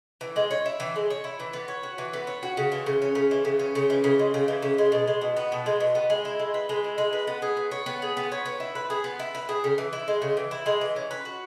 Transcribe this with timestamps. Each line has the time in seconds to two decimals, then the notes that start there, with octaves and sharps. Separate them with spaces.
0.21 E3
0.36 G#3
0.51 C#5
0.65 E4
0.80 E3
0.96 G#3
1.10 C#5
1.24 E4
1.40 E3
1.53 B3
1.68 C#5
1.83 F#4
1.98 E3
2.13 B3
2.27 C#5
2.43 F#4
2.57 C#3
2.72 E3
2.86 C#3
3.02 C#4
3.15 C#3
3.31 E3
3.45 C#3
3.59 C#4
3.75 C#3
3.90 E3
4.04 C#3
4.19 G#3
4.34 C#3
4.48 E3
4.62 C#3
4.78 G#3
4.92 B2
5.07 G#3
5.21 B2
5.37 B3
5.52 B2
5.66 G#3
5.80 B2
5.95 B3
6.10 G#3
6.25 E4
6.39 G#3
6.54 B4
6.69 G#3
6.84 E4
6.98 G#3
7.13 B4
7.27 B3
7.42 G#4
7.57 B3
7.71 C#5
7.86 B3
8.02 G#4
8.17 B3
8.32 C#5
8.45 B3
8.60 E4
8.75 B4
8.90 G#4
9.04 B3
9.19 E4
9.35 B4
9.49 G#4
9.64 C#3
9.78 E3
9.93 E4
10.08 G#3
10.22 C#3
10.37 E3
10.51 E4
10.66 G#3
10.81 E3
10.96 C#4
11.11 B4
11.25 F#4